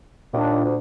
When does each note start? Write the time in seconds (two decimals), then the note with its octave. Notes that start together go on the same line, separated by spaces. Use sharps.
0.33 D#2 A#2 D4
0.64 D2